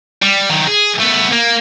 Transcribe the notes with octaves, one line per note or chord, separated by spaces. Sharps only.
G3
D#3 F#3
G#4
A3 B3
A#3